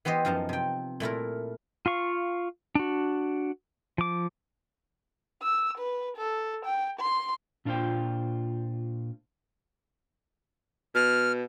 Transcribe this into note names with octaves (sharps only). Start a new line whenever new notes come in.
E3 B3 G4 C5 D#5
F#2 F3 D#4 A5
C3 G5
A#2 A3 E4 A#4
F4 F5 C#6
D4 F#4
F3 D6
E6
B4
A4
G5
C6
A#2 D4 F4 F#4 C5 G5
B2 F6